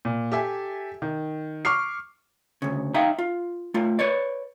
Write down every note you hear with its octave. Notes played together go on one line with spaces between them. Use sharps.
A#2
G4 A4 E5 G#5
D#3
C#6 D6 F6 C7
D2 C#3
D#4 E5 F5 G5 A#5
F4
A3 F4
B4 C#5 D5